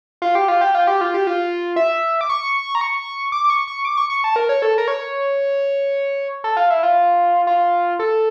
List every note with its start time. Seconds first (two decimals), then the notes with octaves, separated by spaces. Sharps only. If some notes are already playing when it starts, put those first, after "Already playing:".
0.22 F4
0.35 G4
0.48 F4
0.61 G4
0.75 F4
0.87 G4
1.01 F4
1.14 G4
1.27 F4
1.76 E5
2.21 D6
2.29 C#6
2.75 A#5
2.81 C#6
3.32 D6
3.44 D6
3.50 C#6
3.68 C#6
3.85 D6
3.97 C#6
4.10 C#6
4.24 A5
4.36 A#4
4.49 C#5
4.62 A4
4.78 A#4
4.88 C#5
6.44 A4
6.57 F4
6.70 E4
6.83 F4
7.47 F4
7.99 A4